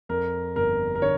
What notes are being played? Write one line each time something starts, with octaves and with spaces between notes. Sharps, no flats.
F2 A#4
G1 A#4
A#4
D3 C#5